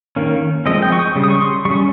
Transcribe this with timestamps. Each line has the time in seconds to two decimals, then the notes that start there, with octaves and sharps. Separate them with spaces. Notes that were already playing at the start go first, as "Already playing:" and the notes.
0.16 D#3 A#3 C#4
0.66 F3 G#3 C4 D#5
0.82 G5
0.92 C#6
0.99 D#6
1.16 C#3 G3
1.24 D#6
1.30 C#6
1.40 C6
1.65 G3 C#4 C#6